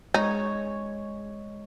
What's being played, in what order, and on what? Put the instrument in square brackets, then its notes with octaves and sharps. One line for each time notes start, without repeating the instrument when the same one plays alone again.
[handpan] G#3 C#5 [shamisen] D#4